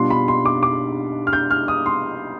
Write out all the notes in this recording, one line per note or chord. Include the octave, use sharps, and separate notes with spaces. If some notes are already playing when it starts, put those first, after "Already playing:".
Already playing: B2 G3 D4 F4 C6
B5
C6
D6
D6
F6
G6
F6
D#6
C6